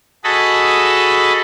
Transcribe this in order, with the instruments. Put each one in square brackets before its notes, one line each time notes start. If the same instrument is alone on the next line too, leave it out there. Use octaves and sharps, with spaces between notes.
[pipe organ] F#4 G#4 A4 D#5 A5 B5